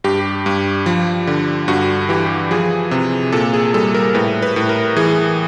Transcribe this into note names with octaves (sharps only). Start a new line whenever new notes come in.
G2 G4
G2
F3
D3
G2 F#4
E3 G4
F3 G#4
C3
A#2 A4
G#4
G3 A4
A#4
A2 B4
B4
A2
A#4
E3 G#4